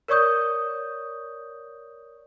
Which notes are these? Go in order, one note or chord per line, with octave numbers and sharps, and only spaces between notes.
A#4 C#5 D5 C#6 D#6 G6